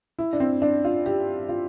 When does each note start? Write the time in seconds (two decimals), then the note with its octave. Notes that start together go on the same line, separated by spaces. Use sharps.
0.19 E4
0.33 D4
0.40 C4
0.62 D4
0.85 F4
1.06 G4
1.49 F4